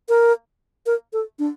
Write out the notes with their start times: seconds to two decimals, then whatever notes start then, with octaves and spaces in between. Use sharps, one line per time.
0.09 A#4
0.86 A#4
1.13 A4
1.39 D4